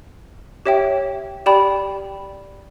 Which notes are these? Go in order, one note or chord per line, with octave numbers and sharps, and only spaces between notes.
G4 C#5 E5 G5
G4 D5 G5 B5